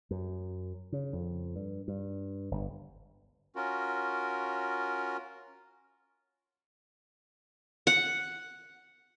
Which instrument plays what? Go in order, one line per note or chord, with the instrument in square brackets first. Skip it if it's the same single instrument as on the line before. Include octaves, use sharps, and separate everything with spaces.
[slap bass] F#2
C#3
F2
G2
G2
G1
[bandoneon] C#4 F4 F#4 A#4
[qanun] F#5